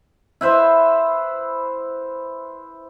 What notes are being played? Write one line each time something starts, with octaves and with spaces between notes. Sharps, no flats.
E4 B4 C5 E5